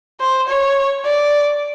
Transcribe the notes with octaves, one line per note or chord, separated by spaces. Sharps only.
C5
C#5
D5